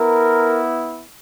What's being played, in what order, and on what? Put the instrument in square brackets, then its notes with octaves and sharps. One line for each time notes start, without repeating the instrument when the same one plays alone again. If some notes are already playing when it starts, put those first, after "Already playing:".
Already playing: [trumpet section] B3 E4 A#4